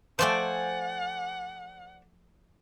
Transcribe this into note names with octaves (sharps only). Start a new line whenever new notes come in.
F3 A3 C5 D5 F#5 G#5